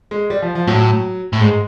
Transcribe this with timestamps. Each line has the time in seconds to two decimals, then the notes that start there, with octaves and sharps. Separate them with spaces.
0.11 G#3
0.30 G3
0.42 F3
0.55 F3
0.67 A2 F#3
1.33 A2
1.41 G#2 G#3